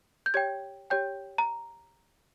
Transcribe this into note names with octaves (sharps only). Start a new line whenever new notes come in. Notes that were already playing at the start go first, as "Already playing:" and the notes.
G6
G4 C#5 G5 G#6
G4 C#5 G5 G6
A#5